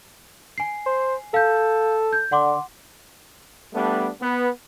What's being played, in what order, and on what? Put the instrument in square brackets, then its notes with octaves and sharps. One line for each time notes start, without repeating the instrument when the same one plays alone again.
[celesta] G#5 C7
[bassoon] C5
[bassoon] A4 [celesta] F5 G6
[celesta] G6
[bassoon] D3 [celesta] F#5 C6 D6
[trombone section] G3 A3 B3 D4
B3